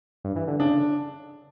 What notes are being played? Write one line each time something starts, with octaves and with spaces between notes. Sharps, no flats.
G2
E3
D3
C#3 D4